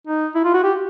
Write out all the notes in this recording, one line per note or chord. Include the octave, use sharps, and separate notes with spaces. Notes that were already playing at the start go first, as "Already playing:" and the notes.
D#4
E4
F4
F#4
G4